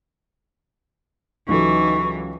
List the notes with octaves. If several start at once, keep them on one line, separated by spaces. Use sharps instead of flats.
C#2 E3 F#3 D#4 A4 C#6